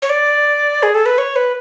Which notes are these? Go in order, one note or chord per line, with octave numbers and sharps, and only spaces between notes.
C#5
D5
G#4
A4
B4
C#5
B4